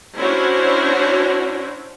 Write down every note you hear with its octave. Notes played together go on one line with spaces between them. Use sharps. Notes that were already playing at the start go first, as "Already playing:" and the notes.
C#4 D4 E4 F#4 C5 C#5